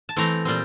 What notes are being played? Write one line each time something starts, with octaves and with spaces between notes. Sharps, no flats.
A5
E3 A3 C4 A#5
A#2 G3 C4